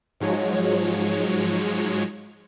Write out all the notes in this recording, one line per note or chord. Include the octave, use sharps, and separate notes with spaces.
G#2 F3 F#3 G#3 C#5